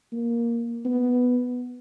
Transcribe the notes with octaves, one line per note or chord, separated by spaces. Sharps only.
A#3
B3